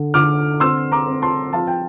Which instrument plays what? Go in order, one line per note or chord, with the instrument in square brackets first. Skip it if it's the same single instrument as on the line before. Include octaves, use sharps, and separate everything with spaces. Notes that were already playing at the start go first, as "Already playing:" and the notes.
Already playing: [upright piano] D3
D3 D6 F6
C4 C6 E6
A#5 D6
C4
A5 C6
F3 F5 A5
G5